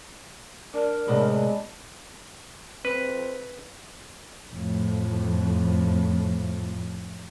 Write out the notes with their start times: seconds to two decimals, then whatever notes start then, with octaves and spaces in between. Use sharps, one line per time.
0.74 D4 A#4
1.08 A2 C3 G#3 B3 D4 B5
2.85 C4 B4
4.51 F2 A2